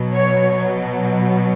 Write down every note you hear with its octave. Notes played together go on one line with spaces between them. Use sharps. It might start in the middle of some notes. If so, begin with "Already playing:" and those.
Already playing: B2 F#3
C#5